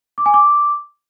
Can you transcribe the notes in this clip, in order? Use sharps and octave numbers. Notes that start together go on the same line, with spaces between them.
D6
G#5
D6